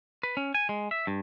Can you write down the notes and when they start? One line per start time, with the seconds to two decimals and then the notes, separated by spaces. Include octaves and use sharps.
0.23 B4
0.37 C#4
0.55 G#5
0.69 G#3
0.91 E5
1.07 G2